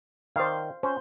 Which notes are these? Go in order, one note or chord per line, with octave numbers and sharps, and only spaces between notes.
D#3 C5 D5 F5
C#4 C5